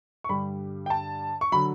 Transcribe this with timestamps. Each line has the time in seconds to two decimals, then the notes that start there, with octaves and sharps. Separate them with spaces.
0.24 C#6
0.29 G2 D3 G3 B5
0.86 G5
0.90 A5
1.41 C#6
1.52 D3 F#3 B5